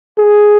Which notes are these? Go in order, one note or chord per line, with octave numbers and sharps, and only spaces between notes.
G#4